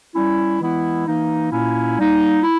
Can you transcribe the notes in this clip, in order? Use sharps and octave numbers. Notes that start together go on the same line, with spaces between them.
G3 C#4 E4
E3 G#3 B3 E4
E3 A#3 D#4
A#2 A#3 C#4 E4
G3 A#3 D#4
E4